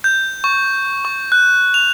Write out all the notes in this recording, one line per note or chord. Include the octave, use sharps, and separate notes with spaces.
G6
C#6
C#6
F#6
F7